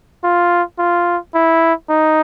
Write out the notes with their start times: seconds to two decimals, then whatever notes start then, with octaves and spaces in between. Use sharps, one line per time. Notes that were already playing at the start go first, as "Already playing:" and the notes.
0.24 F4
0.79 F4
1.35 E4
1.89 D#4